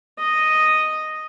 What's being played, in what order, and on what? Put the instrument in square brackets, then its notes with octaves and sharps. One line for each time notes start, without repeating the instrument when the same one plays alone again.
[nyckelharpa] D#5